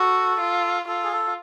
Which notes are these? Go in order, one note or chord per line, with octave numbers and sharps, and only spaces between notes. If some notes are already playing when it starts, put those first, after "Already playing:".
Already playing: F#4 A4
F4
F4 A4
G#4
A4